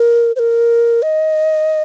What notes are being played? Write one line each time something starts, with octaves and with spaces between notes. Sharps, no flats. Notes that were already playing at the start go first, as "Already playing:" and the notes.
Already playing: A#4
C5
A#4
D#5